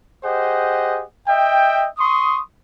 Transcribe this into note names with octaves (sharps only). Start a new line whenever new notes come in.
G4 G#4 C5 D#5 F#5
D#5 E5 G5
C6 C#6 D#6